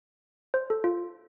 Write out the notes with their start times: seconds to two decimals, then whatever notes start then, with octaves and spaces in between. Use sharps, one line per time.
0.54 C5
0.70 A4
0.84 F4